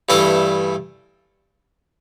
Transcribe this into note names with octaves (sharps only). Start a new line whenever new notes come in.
G2 E3 A3 D4 A4